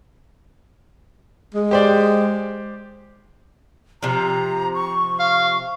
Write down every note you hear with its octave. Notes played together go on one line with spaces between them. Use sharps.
G#3
G4 C5 D5
C3 F3 A#5
C#6
F5